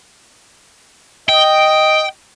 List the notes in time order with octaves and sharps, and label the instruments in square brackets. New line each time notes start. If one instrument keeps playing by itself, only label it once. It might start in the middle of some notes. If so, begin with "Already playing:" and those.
[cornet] D#5 [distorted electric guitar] G5